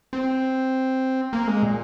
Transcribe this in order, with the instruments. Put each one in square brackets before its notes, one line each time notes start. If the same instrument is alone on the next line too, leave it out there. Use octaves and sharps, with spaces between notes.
[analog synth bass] C4
A#3
G#3
A#2